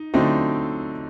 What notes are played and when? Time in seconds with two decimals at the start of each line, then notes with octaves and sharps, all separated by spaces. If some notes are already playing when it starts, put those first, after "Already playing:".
Already playing: D#4
0.14 D3 F#3 A3 C4 D#4